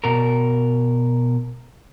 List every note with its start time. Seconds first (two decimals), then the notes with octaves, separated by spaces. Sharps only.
0.04 B2 A#4